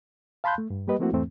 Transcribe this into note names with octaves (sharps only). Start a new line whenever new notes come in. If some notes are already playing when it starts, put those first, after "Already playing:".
F5 A5 B5 C6 F#6 G6
A3
G2
G3 A#3 G4 B4 D#5
F3 A3 A#3 C4 E4 F#4
E2 G#2 E3 A3 C4